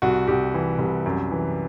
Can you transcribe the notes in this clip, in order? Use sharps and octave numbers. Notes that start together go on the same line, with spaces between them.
C2 F#4
C2 G4
E3
C2
F#2
E3